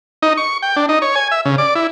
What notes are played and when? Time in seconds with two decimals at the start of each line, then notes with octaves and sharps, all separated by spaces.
0.23 D#4
0.37 C#6
0.62 G5
0.76 D4
0.89 D#4
1.02 C#5
1.15 G#5
1.31 E5
1.45 C#3
1.58 D5
1.75 E4